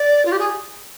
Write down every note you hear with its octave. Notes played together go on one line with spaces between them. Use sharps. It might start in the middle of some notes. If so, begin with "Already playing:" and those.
Already playing: D5
F4
G4
G#4